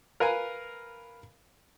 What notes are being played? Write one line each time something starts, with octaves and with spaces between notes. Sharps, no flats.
A#4 B4 F5 G#5 A#5